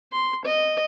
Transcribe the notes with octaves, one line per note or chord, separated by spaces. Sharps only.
C6
D#5